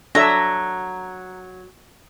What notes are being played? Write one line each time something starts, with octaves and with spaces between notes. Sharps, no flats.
F#3 D4 A4 E5 A#5